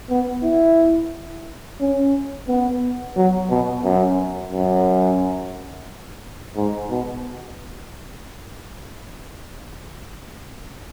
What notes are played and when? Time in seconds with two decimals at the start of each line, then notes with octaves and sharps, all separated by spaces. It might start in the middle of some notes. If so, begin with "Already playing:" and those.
0.10 B3
0.43 E4
1.80 C#4
2.48 B3
3.16 F#3
3.50 B2
3.84 F#2
4.52 F#2
6.56 G#2
6.90 B2